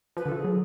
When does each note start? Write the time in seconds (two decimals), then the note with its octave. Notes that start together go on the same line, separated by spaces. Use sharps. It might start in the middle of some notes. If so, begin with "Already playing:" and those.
0.17 F3 B4
0.26 D3
0.29 F3 A4
0.39 G#4
0.44 F#3